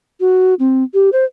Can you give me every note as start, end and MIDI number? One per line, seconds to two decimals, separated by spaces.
0.20 0.54 66
0.59 0.84 60
0.94 1.10 67
1.13 1.25 72